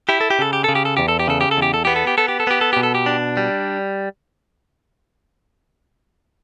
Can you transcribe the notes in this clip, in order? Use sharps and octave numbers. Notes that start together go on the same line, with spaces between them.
E4 G4
A4
G4
C#3 A4
G4
C#3 A4
G4
A4
E2 G4
A4
G4
C#3 A4
G4
A4
E2
G4
A4
B3 G4
A4
G4
B3 A4
G4
A4
B3 G4
A4
B2 G4
A4
G4
D4
G3